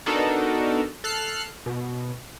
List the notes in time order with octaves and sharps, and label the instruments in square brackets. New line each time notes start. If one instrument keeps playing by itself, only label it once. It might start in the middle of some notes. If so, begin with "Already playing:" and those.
[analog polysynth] B3 D4 D#4 F#4 A4 A#4
A4 F6 F#6 C7
B2